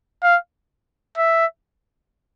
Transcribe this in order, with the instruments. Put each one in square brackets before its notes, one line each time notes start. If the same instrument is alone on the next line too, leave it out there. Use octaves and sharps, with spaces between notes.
[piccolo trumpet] F5
E5